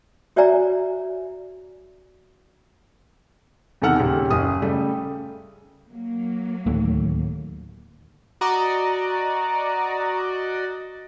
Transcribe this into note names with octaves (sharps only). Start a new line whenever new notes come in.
F#4 C#5 D5 E5 G#5 A#5
E2 C3 D#3 A4 F#5 F6
D#1 C#3 G5
F#1 G#5 D#6
C#3 G3 A3
F#3 A#3
D1 D#2 A3
F#4 D5 D#5 A#5